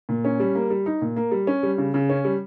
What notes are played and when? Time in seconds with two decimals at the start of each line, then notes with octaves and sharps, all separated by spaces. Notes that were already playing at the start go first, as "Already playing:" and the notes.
0.09 A#2
0.25 C#4
0.40 G3
0.55 A#3
0.70 G3
0.86 D#4
1.02 A#2
1.16 A#3
1.31 G3
1.47 C#4
1.63 G3
1.78 C#3
1.94 C#3
2.09 C#4
2.25 G3